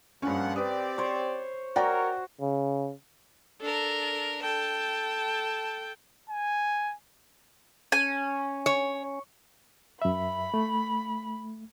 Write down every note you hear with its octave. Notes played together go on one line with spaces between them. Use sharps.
G2 A#2 F3 C#4 F#5
C4 G4 B4 D5 D#6
C5 C#5
F#4 A#4 C#5 D5 G5 A#5
C#3
D4 A4 A#4
A4 G5 A5
G#5
C#4 G#5
C#5
F#2 E5 B5
A3